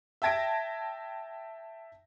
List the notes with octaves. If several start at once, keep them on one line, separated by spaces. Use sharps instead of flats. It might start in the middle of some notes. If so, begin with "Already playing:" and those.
E5 G5 A5 G#6 A#6 D7